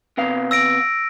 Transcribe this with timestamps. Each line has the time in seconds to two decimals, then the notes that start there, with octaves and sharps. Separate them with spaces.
0.17 C3 B3 F5
0.51 E6 A#6 D7